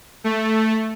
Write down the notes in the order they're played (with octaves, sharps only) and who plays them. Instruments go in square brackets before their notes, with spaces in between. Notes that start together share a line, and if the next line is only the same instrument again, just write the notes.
[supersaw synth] A3